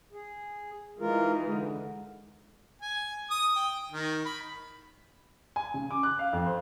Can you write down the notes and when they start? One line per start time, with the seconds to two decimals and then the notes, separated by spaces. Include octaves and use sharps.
0.13 G#4
0.99 E3 G#3 D#4 F4 A#4
1.43 D3
2.82 G#5
3.30 D#6
3.56 G5
3.92 D#3
4.25 B5
5.56 G#5
5.74 C#3
5.91 D6
6.03 F#6
6.19 F5
6.33 F2
6.46 C5